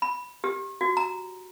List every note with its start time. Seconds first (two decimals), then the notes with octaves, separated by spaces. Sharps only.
0.02 B5
0.44 G4
0.81 F#4
0.97 A#5